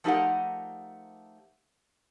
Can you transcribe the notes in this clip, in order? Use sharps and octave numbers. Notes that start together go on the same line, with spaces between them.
F3 A3 D#4 G4 A#4 F#5